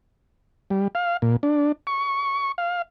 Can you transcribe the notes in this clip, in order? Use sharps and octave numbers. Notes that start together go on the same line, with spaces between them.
G3
F5
A#2
D4
C#6
F5